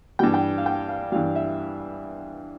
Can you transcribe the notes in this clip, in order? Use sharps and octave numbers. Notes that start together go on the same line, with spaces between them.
G2 E3 G3 G5
G5
F5
G5
F5
G2 E3 G3 F5
E5